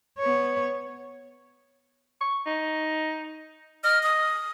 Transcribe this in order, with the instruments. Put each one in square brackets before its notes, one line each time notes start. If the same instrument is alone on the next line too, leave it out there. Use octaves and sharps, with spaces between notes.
[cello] B3 C#5
[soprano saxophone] C#6
D#4
[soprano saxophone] D#5 [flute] F6
[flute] D#6